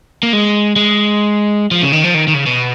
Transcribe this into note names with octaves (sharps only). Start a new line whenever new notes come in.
A#3
G#3
G#3
F3
C#3
D#3
F3
D#3
D#3
C#3
B2